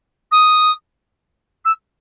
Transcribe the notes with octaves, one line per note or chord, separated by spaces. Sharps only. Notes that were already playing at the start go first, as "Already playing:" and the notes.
D#6
E6